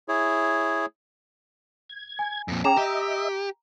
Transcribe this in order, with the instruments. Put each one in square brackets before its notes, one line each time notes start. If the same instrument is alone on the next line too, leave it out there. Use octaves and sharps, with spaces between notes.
[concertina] E4 G#4 C#5
[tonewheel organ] G#6
[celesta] G#5
[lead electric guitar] F2 A#2
[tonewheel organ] C#4 G#4 [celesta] G5 D6 E7 [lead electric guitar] A#5
[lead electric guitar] G4 [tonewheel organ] D#5 E5 [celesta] A#5